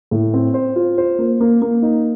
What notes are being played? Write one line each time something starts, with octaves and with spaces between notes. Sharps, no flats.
A2
C4
C5
F4
C5
A#3
A#3
A#3
D#4